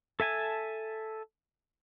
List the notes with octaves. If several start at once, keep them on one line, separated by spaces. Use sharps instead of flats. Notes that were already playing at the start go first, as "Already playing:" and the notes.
A4 E5 G#5 A5